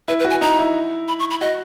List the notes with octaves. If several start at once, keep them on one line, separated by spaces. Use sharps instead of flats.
E4 B4
B4
F#4
G#5
D#4 A#5
E4
B5
C#6
B5
F#4 D#5